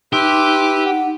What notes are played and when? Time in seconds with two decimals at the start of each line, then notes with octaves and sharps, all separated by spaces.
0.13 D#4 G4 B4 E5 C6 D6
0.85 F#5